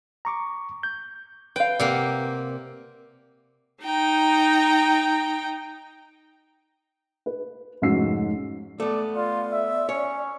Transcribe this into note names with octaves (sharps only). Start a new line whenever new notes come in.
A#5 C#6 D6
G6
B4 F5 G5
C3 A#3 D5 F#5
D#4 G5 A#5
B4
F1 G#2 C#4 F#4 E6 C7
A3 B3 D5
F4 D5
E5
C#4 C#5